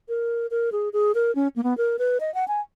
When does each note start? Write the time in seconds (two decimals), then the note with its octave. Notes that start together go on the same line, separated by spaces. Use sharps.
0.09 A#4
0.51 A#4
0.72 G#4
0.93 G#4
1.15 A#4
1.35 C#4
1.56 A#3
1.64 B3
1.78 A#4
1.99 B4
2.20 D#5
2.34 F#5
2.48 G#5